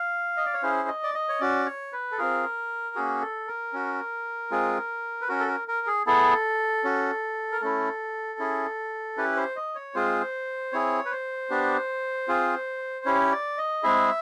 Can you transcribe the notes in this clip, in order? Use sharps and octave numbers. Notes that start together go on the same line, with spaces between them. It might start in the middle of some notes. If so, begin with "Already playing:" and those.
Already playing: F5
D#5
D5
C#5
C#4 E4 G#4 C5
D#5
D5
D#5
C#5
C#4 F#4 D5
C#5
B4
A4
C4 F4 G#4 A#4
A#3 C#4 F#4 G#4
A4
A#4
C#4 F#4
G#3 C4 F4 G#4
B4
C#4 F#4 A#4
A4
A#4
A#4
G#4
B3 E4 G#4 A4
C#4 F#4
A#4
A3 C#4 E4 A4
C#4 E4 G#4
C#4 E4 G4 B4
C5
D#5
C#5
G#3 C4 F4 G#4 C5
C4 E4 G#4 C#5
B4
C5
B3 D4 G4
C4 F4 G#4
C#4 E4 G4 C#5
D5
D#5
G#3 C4 E4 G#4 E5